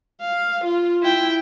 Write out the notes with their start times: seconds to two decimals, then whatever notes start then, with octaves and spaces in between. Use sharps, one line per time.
0.21 F5
0.65 F4
1.02 E4 G5